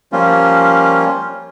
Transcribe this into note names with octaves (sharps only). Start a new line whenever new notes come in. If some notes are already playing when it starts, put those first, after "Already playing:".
F3 G3 A#3 C#4 F4